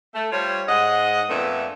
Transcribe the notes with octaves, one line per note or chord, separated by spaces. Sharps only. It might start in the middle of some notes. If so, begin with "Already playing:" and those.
A3
G3 F4 C5 C#5
G#2 D#5 F#5
F2 A#2 A3 B3 D4 E5